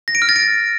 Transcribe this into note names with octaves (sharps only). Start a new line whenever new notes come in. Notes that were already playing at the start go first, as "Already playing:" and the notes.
A#6
D7
F6
A6
D7